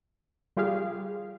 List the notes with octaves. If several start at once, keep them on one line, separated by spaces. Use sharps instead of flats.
G3 F4 G4 G#4 F5